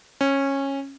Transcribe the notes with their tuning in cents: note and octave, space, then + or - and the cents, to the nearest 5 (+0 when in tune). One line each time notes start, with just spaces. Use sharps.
C#4 -15